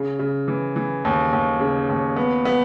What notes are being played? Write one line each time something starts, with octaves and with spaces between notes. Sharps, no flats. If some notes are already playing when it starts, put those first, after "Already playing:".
Already playing: C#3
C#3
E3
E3
D#2
D#2
C#3
D#2
B3
B3